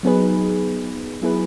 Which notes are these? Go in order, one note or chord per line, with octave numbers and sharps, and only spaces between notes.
F#3 B3 D#4 G#4 B4
F#3 B3 E4 G#4 B4